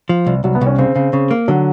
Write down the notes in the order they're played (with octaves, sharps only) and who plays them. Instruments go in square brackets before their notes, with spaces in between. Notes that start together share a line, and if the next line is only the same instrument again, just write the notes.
[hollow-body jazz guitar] F3
C2
[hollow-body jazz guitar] C2 [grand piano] F#3
[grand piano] B3
[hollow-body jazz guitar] C2
[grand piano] C#4
[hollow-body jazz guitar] C#3 [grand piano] C4
[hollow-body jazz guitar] C#3
C#3
A#3
[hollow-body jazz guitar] D3 [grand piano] F#3